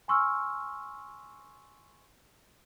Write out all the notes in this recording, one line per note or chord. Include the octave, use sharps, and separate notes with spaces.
G#5 C6 C#6 E6 F6